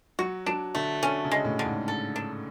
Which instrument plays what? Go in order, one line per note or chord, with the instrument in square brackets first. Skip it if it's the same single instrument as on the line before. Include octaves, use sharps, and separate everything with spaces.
[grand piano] F#3 [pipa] F#4
[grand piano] F#3 [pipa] D4
[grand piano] D3 [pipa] A3
[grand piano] D3 [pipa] C#4
[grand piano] C#3
[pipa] G#3
[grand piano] A2
[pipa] D3
[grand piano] G#2
[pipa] A4
D4